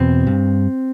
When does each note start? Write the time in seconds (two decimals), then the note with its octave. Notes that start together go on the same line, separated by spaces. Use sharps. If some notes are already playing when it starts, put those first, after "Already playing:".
Already playing: E2 B2 C4
0.27 G2